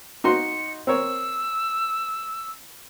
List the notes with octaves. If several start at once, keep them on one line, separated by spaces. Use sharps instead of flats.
D#4 F#4 C6 C#7
C4 A#4 C#5 E6